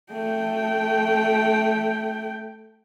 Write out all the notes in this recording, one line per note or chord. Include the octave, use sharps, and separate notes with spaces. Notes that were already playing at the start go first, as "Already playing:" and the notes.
A3 G5